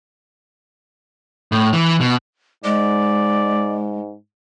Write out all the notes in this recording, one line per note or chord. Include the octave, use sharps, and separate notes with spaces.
A2
E3
B2
G#2 G#3 D5